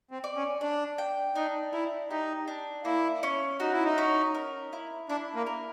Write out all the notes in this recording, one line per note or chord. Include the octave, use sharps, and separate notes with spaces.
C4
D5
C#4
D4 D5
G5
D4 D#4
E4 A#4
D#4 G4
D4
A#3 E4
C#4
D#4 F#4
E4
D#4
C#4
A#4
E4
D4 E4
A#3
A#4